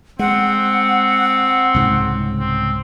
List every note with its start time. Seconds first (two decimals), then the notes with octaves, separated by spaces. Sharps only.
0.19 G#3 C4 F#5
1.74 C2 G#2 C#3
2.40 C4